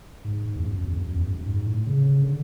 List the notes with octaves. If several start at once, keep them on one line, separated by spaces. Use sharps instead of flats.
G#2
G#2
E2
F#2
F#2
E2
F#2
E2
G#2
F#2
G#2
A2
C#3
C#3
D3